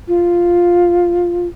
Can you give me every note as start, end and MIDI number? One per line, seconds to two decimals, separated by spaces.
0.08 1.47 65